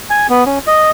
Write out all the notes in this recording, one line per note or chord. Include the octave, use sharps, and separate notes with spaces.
G#5
B3
C#4
D#5